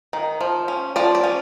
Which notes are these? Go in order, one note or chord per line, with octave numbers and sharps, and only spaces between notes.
D#3
F3
C#4
F3 D5
D5
C#4